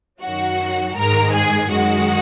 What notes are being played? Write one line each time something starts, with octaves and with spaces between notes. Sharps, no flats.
F#2 D#3 F#3 F#4 F#5
G#2 D#3 G#3 A#4 A#5
G#4 G#5
F#2 D#3 G#3 F#4 F#5